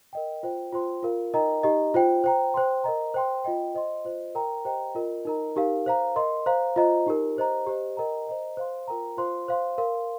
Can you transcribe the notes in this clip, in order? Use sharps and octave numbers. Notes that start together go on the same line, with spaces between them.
A#4 D#5 G5
F4 C5 G5
F4 C5 G5 C6
F4 A#4 F5
D#4 A#4 D#5 G5 A#5
D#4 G4 D#5 A#5
F4 C5 G5
C5 G5 A#5
C5 G5 C6
A#4 D#5 A#5
C5 G5 C6
F4 D#5 G5
C5 D#5 C6
F4 C5 D#5
A#4 G5 A#5
G4 C5 D#5 G5 A#5
F4 A#4 D#5
D#4 A#4 D#5 A#5
D#4 G4 A#4 F5
C5 F5 A#5
A#4 D#5 C6
C5 F5 A#5
F4 C5 D#5 A#5
D#4 G4 A#4
G4 C5 D#5 A#5
G4 C5 D#5
A#4 D#5 G5 A#5
C5 D#5 A#5
C5 F5 C6
F4 A#4 G5 A#5
F4 C5 F5 C6
C5 F5 C6
A#4 F5 C6